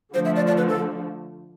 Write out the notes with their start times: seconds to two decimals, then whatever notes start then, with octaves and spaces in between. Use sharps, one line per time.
0.14 D3 F3 A3 C5
0.25 E5
0.36 D5
0.47 D5
0.57 B4
0.69 A4